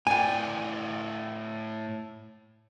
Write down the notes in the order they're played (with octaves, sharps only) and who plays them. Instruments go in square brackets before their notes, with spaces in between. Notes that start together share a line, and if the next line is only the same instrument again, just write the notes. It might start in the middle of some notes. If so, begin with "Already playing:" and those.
[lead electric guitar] A2 D5 [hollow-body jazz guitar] G5 G#5